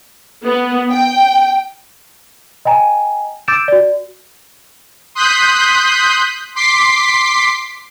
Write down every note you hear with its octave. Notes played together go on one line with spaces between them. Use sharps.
B3
G5
D#5 G5 G#5 A#5
D6 E6 G6 A6 D7 E7
F#4 D5
C6 D#6 F#6 G6 B6
C6 D6 B6 C7